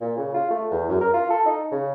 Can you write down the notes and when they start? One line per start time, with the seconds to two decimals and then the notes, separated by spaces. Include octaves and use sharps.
0.01 A#2
0.17 C#3
0.34 F4
0.51 A3
0.71 E2
0.89 F#2
1.01 A#4
1.14 F4
1.30 A4
1.46 D#4
1.72 C#3